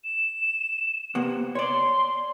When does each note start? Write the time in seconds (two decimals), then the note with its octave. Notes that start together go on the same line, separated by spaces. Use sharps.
0.04 E7
1.15 C3 A#3 B3
1.55 C#5 D5 C6